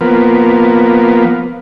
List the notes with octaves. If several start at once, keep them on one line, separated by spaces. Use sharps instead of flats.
F3 A#3 B3